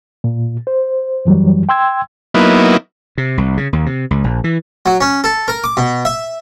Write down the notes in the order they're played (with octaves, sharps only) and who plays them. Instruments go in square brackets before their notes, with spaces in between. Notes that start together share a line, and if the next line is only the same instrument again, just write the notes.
[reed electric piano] A#2
C5
F#2 E3 F#3 G3
G5 C6 E6 G#6
[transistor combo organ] F#3 A#3 B3 D#4 E4
[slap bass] C3
C2
C#3
D#2
C3
C#2
A#1
E3
[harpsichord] F#3
C#4
A4
A#4
D6
B2
E5